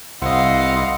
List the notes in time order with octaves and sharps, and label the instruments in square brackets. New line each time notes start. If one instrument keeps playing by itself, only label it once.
[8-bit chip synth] C2 D#5 [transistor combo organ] C4 E4 [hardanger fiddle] F5 [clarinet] F#5